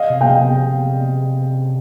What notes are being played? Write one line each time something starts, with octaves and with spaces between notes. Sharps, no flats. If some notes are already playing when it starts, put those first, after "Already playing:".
Already playing: D#5 F5
C3
F5 G5
C3